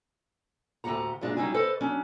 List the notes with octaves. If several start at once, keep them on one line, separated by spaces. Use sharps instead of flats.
D2 A2 C3 G4 F#5 A#5
F#2 A#2 G#3 D4
F#3 G3 D#4 E4 G#5
A4 B4 C5 D#5
F#3 C#4 D4